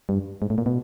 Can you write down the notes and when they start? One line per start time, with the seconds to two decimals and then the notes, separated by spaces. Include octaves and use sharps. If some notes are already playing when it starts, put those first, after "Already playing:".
0.09 G2
0.42 G#2
0.50 A2
0.58 A#2
0.66 B2